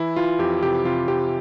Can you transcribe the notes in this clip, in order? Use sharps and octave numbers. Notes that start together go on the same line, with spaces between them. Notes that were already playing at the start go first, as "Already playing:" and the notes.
Already playing: E3 E4
E3 F4
F2 G4
C3 G4
C3 F4
C3 G4